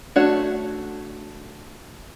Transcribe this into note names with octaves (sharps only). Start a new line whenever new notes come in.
A3 D4 F#4 C#5